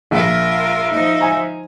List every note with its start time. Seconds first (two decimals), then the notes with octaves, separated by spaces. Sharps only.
0.11 A#1 F4 A#4 E5
0.91 F3 D#4
1.20 G#5 A#5